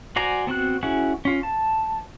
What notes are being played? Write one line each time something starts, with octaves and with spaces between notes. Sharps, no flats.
F#4 C5 D5 G#5 A#5
B3 C4 F#4 F#6
C#4 E4 F#4 G#4 F#5
C#4 F4
A5